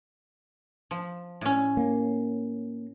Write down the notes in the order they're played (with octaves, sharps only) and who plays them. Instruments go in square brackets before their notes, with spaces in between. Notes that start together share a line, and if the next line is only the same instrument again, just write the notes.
[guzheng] F3
A2 C#4
[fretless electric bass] A#3